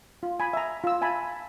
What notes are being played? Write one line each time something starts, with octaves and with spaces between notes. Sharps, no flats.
F4
G#5 B5
E5 A#5
F4 E6
E5 G#5 A5 B5